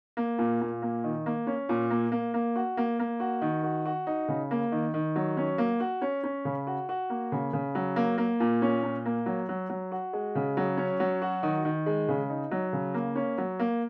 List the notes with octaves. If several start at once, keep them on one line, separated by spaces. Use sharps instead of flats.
A#3
A#2
A#2
A#3
D#3
A#3
C#4
A#2
A#3
A#3
A#3
F#4
A#3
A#3
F#4
D#3
F#4
F#4
D#4
C#3
A#3
D#3
D#3
F#3
C#4
A#3
F#4
C#4
C#4
C#3
F#4
F#4
A#3
C#3
C#3
F#3
A#3
A#3
A#2
C#4
A#2
A#3
F#3
F#3
F#3
F#4
G#3
C#3
F#3
C#4
F#3
F#4
D#3
D#3
G#3
C#3
D#4
F#3
C#3
A#3
C#4
F#3
A#3